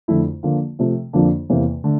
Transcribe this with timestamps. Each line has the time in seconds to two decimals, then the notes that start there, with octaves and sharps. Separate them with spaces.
0.08 F2 D3 A3 E4
0.43 D3 F3 A#3 F4
0.79 C3 F3 A3
1.13 F2 D3 F3 A#3 D4
1.50 E2 C3 E3 A#3
1.84 D3 A3